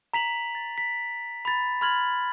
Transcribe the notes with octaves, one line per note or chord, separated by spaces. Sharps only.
A#5 B6 F7 F#7
A6
B6
B5 A6
B5 C6 F6 G#6 F#7